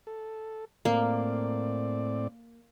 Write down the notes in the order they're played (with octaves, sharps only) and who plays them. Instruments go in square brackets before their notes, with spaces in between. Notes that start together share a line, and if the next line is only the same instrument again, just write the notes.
[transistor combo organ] A4
[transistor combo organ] A2 C4 D5 [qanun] A#3